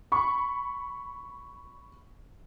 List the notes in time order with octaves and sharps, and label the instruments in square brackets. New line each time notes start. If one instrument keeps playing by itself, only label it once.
[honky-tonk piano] B5 C#6